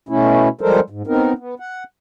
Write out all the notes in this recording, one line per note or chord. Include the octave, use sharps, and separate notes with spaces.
B2 A3 C#4 E4
F3 G3 G#3 A4 A#4 C5
G#2
B3 C4 D#4 A#4
B3
F#5